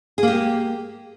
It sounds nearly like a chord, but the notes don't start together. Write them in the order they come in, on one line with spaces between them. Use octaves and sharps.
G#4 A#3 G4